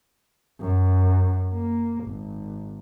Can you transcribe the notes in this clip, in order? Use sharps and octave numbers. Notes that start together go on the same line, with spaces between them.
F#2
A#3
G#1